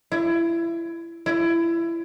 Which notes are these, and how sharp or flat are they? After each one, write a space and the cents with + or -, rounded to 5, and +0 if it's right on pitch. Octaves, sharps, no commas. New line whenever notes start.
E4 +25
E4 +25